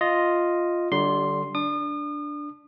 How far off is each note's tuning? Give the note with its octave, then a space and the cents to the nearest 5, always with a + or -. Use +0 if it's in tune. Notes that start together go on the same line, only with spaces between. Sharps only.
F4 +0 D#5 +0
D3 -10 G3 -35 C6 +0
D4 +0 D#6 -40